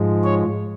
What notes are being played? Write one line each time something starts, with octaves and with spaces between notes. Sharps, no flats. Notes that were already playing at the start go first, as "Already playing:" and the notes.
Already playing: G#2 F3 G#3
C#5